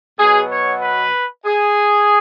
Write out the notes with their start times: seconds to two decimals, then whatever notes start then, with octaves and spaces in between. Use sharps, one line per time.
0.18 B2 F#3 B3 G#4
0.50 C#5
0.81 B4
1.45 G#4